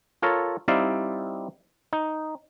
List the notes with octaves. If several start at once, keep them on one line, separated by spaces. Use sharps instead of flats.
F4 A4 A#4 C#5
G3 C4 D#4 E4 D5 F5
D#4